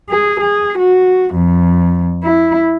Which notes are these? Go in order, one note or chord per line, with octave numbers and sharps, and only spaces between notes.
G#4
G#4
F#4
F2
E4